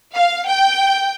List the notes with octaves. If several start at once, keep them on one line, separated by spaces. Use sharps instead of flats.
F5
G5